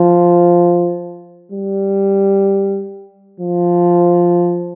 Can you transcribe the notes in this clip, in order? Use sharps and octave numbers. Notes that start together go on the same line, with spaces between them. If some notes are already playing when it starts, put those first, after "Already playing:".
Already playing: F3
G3
F3